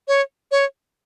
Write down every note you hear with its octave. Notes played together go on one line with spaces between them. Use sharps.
C#5
C#5